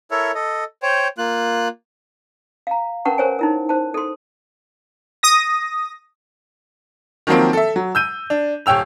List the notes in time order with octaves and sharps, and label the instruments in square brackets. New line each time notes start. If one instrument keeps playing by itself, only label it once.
[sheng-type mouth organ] E4 A4 A#4 C#5 E5
A4 D#5
C5 C#5 G5
A#3 F4 F#6
[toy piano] F5 A#5
C#4 A#4 B4 F#5 A5 C#6
A#4 C5 C#5 G#5
D#4 E4 A#4
C5 A5
A4 C6
[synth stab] D#6 A#6
[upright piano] D#3 F3 F#3 A#3 C4
A4 E5
F#3
E6 G6 D#7
D4
D#1 C#5 G5 E6 F7